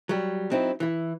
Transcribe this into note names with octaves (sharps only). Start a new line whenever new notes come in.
F#3 G3
F#3 C4 D#4 E4
E3 E4